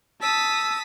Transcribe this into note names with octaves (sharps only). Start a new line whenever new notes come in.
A5 D#6 E6 B6